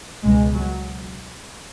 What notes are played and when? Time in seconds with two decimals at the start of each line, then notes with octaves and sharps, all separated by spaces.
0.23 C#2 B2 G#3
0.54 F#3